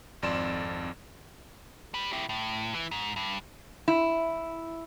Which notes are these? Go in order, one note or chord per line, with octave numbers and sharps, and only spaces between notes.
G#1 F2 D5 C6 E7
G3 B4
E4 G4
A2
E3
G#2
G2
E4